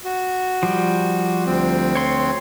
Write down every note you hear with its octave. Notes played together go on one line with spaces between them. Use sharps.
F#4
F3 G3
D2 C4
C#5 C6